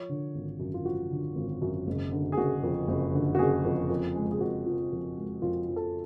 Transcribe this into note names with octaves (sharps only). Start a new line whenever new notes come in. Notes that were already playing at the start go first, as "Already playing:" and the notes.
Already playing: F3 C#5
D3
G#1
F#2
F4
F3 F#4
D3
G#1
F#2
F#1
D3
G#4
F#1 F#4
F2
F#1
D3
F#4
F#1 G#4
F2
F2
G#3
G#4
F2 F#4
F3
F2
G#3
F2 F4
F3
A4